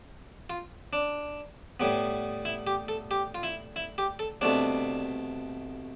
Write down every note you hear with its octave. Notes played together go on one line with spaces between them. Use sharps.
F4
D4
A2 G3 B3
E4
G4
A4
G4
F4
E4
E4
G4
A4
C2 B2 A3 D4